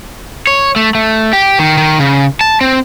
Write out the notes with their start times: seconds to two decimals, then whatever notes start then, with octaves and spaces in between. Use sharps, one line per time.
0.47 C#5
0.76 A3
0.95 A3
1.33 G4
1.59 D#3
1.78 D#3
2.00 C#3
2.41 A5
2.61 C4